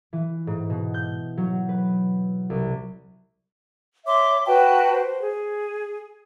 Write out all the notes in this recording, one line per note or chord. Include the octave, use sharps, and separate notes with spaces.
E3
G#2
B2
G6
F#3
B4
C2
C#5 E5 C6 D6
F#4 B4 G5 A5
C5
G#4